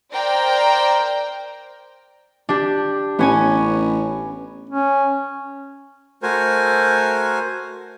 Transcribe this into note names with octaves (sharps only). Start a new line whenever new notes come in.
A#4 C5 D5 G5 A#5
D4 G4
A1 B3 C#4 G#5
C#4
A3 F#4 A#4 C5 G#5